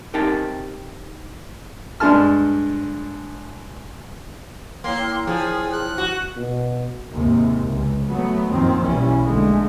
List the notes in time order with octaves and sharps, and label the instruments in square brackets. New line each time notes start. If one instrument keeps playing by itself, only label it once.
[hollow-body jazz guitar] C4 D#4 G4 A#4 G5 A5
[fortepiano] G2 G#3 D4 A5 F6
[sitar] A#3 [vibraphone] E4 C#5 G5 [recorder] C6
[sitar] F3 [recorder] G#4
[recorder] F#6
[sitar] F#4
[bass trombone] B2
[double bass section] D#2 G#2 C3
C#2
F#3 A3 B3
F#2 A#2 D#3 F3 C4
B1 E3 G3 C#4
A#1 D3 G#3 A3